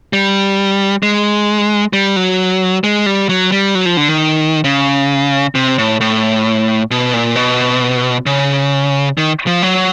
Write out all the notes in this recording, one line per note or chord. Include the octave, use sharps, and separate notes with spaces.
G3
G#3
G3
F#3
G#3
G3
F#3
G3
F#3
F3
D3
D#3
C#3
C3
A2
A2
B2
A#2
B2
C#3
D#3
F3
F#3